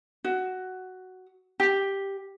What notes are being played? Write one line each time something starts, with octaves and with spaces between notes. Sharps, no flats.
F#4
G4